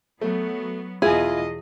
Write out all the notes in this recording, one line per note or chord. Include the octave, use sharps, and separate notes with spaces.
F#3 A3 B3
E2 B2 E4 F4 G#4 D#5 G#5